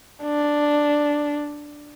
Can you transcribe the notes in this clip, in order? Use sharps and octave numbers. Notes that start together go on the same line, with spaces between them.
D4